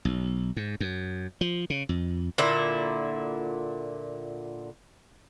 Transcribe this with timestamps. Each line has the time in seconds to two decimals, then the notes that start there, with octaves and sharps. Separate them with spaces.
0.05 B1
0.56 G#2
0.80 F#2
1.41 F3
1.70 C#3
1.89 F2
2.38 A#2 D3 E4